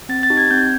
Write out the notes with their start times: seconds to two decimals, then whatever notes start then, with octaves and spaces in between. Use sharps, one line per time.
0.09 C4 A6
0.23 A6
0.30 D#4 G4
0.37 G#6
0.51 C4 G6